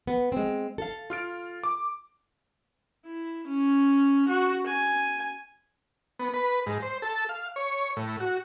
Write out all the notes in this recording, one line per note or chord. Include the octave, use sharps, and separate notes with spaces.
B3
G#3 C4
A4 F5
F4 F6 D7
D6
E4
C#4
F#4
G#5
B3
B4
G#2
C5
A4
F5
C#5
A2
F#4